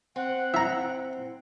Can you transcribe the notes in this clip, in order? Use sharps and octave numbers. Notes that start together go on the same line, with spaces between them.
C4 F#5
E4 E5 A#5